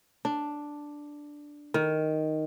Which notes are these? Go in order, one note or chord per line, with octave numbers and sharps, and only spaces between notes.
D4
D#3